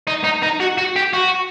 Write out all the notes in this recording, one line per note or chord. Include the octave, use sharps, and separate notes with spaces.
D#4
D#4
D#4
F#4
F#4
G4
F#4